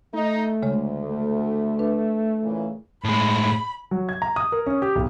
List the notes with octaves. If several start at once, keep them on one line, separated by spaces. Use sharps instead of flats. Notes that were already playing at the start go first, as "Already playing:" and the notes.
A3 D#4
D2 C#3 G#3 C#5
A3
D4 B4
A#2 C#3 E3
A2 G#3 B5
F#3
G#6
A#5
D#6
A#4
C#4
G4
B1